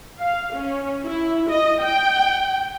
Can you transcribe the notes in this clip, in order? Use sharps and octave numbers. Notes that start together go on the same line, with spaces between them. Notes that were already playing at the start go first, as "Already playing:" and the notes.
F5
C#4
E4
D#5
G5